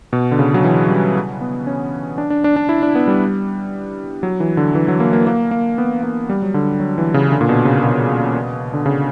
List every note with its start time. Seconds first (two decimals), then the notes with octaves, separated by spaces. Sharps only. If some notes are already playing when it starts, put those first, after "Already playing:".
0.13 B2
0.31 D3
0.39 C#3
0.54 F#3
0.64 E3
0.89 G3
1.41 B3
1.67 C#4
2.18 D4
2.30 D4
2.44 D4
2.56 D4
2.69 E4
2.83 D4
2.95 B3
3.08 G3
4.23 F#3
4.40 E3
4.57 D3
4.75 E3
4.88 F#3
5.00 A#3
5.13 A#3
5.27 A#3
5.51 A#3
5.78 B3
6.03 A#3
6.29 G3
6.42 F#3
6.54 D3
6.80 F#3
6.98 E3
7.14 C#3
7.32 D3
7.41 A#2
7.49 B2
7.65 C#3
7.83 B2
8.74 D3
8.86 C#3